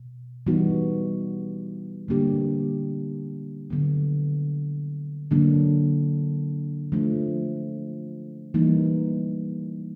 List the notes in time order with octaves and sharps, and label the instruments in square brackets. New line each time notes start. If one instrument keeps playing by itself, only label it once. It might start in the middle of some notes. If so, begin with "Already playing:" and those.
Already playing: [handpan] B2
E3 G3 B3 D#4 F#4
D3 G3 A#3 D4 G4
D3 F#3 B3
D3 F#3 A#3 D4
F3 A3 D4
E3 G3 A#3 D#4